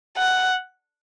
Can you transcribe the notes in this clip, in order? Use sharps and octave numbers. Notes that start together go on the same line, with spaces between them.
F#5